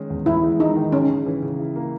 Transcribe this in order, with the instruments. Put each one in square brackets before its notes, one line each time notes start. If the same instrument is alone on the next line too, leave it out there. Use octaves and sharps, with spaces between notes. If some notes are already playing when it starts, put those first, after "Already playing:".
Already playing: [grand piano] D#3 G#3 C#4
E2
[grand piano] E2 [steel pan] E4
[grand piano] G#3
[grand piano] G#3 [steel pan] D#4
[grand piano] D#3
[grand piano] C#3 [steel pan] C#4
[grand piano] C#3
E3
C#3
E4
A#3